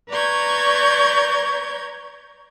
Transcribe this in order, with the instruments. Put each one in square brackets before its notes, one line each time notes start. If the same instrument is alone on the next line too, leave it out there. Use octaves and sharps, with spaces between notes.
[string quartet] B4 D5 A#5 C#6 G6 G#6